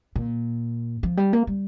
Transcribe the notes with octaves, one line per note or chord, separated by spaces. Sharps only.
A#2
F3
G3
A#3
G3